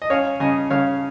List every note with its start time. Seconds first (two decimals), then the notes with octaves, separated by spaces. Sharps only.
0.02 D#5
0.10 C#4 C#5 F5
0.40 C#3 D#5 G#5
0.70 C#3 C#5 F5